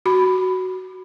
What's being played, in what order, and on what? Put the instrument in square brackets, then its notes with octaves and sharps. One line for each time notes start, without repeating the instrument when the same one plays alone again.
[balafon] F#4 B5